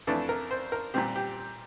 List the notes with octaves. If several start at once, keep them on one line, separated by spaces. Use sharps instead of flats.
F2 E3 A3 D4 A4
A#4
C5
A#4
A#2 G3 C4 G4
G4